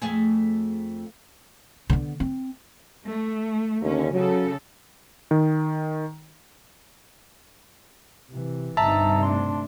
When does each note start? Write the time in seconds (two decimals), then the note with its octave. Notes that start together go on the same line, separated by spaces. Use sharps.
0.02 F2 A3 G#4
1.90 D3 B3
2.20 C4
3.06 A3
3.82 D#2 D3 C#4
4.13 C#3 F#3 A4
5.31 D#3
8.30 C3 E3
8.77 G1 G2 C3 D#4 E5 A5 A#5 E6
9.23 A3 D4 C6